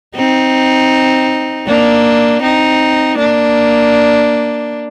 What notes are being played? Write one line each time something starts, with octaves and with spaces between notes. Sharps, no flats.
C4 D#4
A#3 D4
C4 D#4
A#3 D4